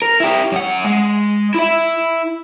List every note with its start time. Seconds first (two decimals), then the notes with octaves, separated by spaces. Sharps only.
0.02 A#4
0.20 E4 G4
0.52 F#2 F#5
0.84 G#3
1.54 E4 E5